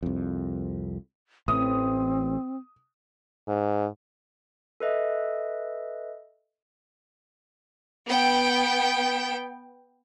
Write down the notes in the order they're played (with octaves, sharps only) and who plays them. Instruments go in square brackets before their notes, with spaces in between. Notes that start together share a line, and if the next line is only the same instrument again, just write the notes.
[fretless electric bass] C2 F2
[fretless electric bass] A1 A2 E3 [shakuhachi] C4 [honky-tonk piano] D#6
[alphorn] G#2
[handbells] A4 B4 D#5 E5
[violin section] B3 G5